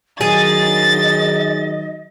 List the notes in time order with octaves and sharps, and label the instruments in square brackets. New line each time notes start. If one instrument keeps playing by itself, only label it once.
[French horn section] D#3 F#3 [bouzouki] G#4 [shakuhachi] D#5 [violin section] A6